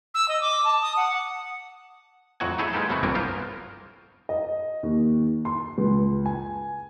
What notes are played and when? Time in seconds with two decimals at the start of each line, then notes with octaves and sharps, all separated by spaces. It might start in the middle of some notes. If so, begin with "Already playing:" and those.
0.14 E6
0.28 D#5
0.42 D6
0.65 A5
0.82 D#6
0.97 F#5
2.40 F2 A2 F#3 F#4 D#5 G#5
2.58 D#4 E4 G#4 A4 C#5 E5
2.73 G#3 A#3 B3 G4 A4
2.89 F#2 C#3 A3 B3 C4 F#4
3.03 G1 C2 E3 A#3 F4 A#4
3.15 B3 F4 A#4 C5
4.29 D#5
4.83 D#2
5.45 C6
5.78 C#2
6.26 G#5